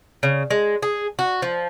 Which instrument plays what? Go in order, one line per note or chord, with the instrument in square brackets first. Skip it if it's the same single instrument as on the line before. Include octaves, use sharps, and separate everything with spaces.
[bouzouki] C#3
G#3
G#4
F#4
F3